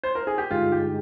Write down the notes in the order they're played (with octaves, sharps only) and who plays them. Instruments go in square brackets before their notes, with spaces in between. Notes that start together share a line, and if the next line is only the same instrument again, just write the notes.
[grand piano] C5
A#4
G#4
G4
[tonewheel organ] G2 D3 G#3 D#4 G#4 [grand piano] F4
[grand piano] G4